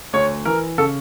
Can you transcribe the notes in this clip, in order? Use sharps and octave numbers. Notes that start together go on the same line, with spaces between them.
D2 C#5
E3 A#4
C#3 A4